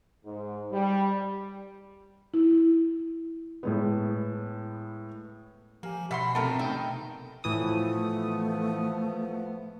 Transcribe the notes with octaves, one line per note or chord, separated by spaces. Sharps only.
G#2
G3
E4
A2 G#3 B3
F3 A#3 G4 G#5
B2 E5 F#5 B5 C6
C3 A3 B3 A4 A#4 D#5 G5
D#4 E5 G5
A2 E3 F3 A3 B3 D#6